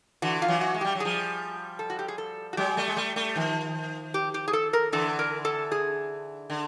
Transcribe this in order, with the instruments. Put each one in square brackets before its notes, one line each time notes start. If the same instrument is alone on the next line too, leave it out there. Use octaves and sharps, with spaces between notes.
[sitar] D3 E3 [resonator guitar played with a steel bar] F#4
[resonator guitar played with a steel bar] F4
[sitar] E3 F#3
[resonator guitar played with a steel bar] F#4
[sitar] G#3
[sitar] G3 [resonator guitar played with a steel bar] G4
[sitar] F#3
[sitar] F3 G3 [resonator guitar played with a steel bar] G#4
[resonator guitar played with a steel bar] A4
F#4
G4
G#4
A4
F#4
[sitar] F#3 G#3 [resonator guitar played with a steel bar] G4
[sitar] G3 A3
G#3
G3 A3
G3 A3
D#3 F3
[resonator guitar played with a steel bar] G4
G4
G#4
A4
A#4
[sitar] D3 E3 [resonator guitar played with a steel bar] A4
[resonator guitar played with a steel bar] A#4
A4
G#4
[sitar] D3